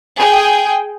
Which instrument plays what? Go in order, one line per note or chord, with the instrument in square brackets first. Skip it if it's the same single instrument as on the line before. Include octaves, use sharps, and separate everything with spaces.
[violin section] G#4 G5